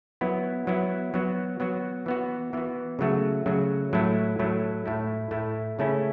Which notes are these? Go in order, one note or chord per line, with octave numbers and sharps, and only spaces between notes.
F#3 B3 E4
F#3 B3 E4
F#3 B3 F#4
F#3 B3 F#4
E3 B3 F#4
E3 B3 F#4
C#3 F#3 A3 F#4
C#3 F#3 A3 F#4
A2 F#3 A3 E4
A2 F#3 A3 E4
A2 A3 E4
A2 A3 E4
C#3 A3 C#4 E4